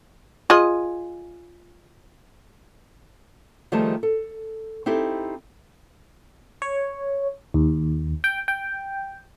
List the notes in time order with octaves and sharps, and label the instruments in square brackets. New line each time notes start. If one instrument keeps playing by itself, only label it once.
[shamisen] F4 G#4 D#5
[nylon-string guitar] D#3 F3 G3 A3 G#4 A5
A4
C4 D#4 E4 G4 A4
[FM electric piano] C#5
D#2
G5
G5